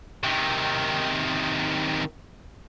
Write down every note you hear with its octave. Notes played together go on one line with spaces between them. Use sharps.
C3 D#3